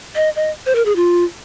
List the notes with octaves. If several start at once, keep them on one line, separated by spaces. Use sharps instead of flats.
D#5
D#5
C5
A#4
G#4
F4